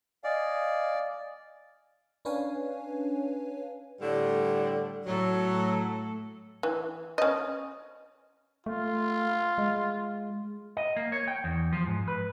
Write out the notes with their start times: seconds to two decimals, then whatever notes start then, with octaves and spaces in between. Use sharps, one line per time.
0.24 D5 D#5 F5 G#5
2.25 C#4 D4 B4 C#5 F5 G#5
4.00 A2 D3 G3
5.06 A2 F#3 A4
6.63 E3
7.18 C#4 D#5
8.66 A3 F4
9.58 G#3
10.77 D#5
10.97 A#3
11.12 C#5
11.28 G5
11.44 E2
11.72 F3
11.86 G#2
12.08 B4